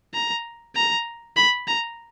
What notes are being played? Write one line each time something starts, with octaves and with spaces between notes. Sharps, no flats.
A#5
A#5
B5
A#5